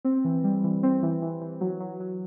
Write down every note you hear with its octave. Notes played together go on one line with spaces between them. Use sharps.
C4
E3
G3
E3
C4
E3
E3
E3
F#3
F#3
F#3